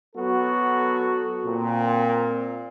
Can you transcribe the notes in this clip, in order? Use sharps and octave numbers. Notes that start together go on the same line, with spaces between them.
F#3 B3 F#4 A4
A#2 C4